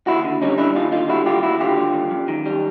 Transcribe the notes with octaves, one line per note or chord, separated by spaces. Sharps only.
D#2 E4 F#4
D3
G3 C#4 D#4
D#2 D4 E4
D#2 D#4 F4
D3 D#4 F4
G3 E4 F#4
D#2 F4 G4
D#2 E4 F#4
D3 F4 G4
G3
D#2
F#2
D#3
G3